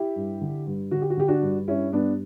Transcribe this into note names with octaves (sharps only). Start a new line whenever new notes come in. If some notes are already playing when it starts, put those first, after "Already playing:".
Already playing: E4 G4
G2
D3
G2
D3 F#4
G4
F#4
D3 G4
D4 F#4
G2
G2 C#4 E4
G2 B3 D4